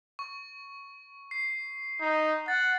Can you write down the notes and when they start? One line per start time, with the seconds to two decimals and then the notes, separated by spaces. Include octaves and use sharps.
0.19 C#6
1.31 C7
2.01 D#4
2.48 F#5 A6